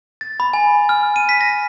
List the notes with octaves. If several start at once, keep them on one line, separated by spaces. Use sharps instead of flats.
A6
B5
G#5
F6
D#7
B6
A#6